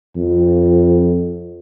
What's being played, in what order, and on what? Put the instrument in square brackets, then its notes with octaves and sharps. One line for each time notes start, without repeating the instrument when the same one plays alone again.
[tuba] F2